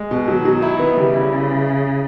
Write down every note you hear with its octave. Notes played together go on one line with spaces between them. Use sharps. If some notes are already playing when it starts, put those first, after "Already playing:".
Already playing: G#3
B2
D#3 F#3
F#3
E4
B3
C#3 G3
E4